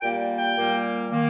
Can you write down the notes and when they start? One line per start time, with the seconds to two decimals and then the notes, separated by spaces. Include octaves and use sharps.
0.02 A#2 G3 A#3 G5
0.38 G5
0.56 A#2 G3 A#3
1.12 D#3 A#3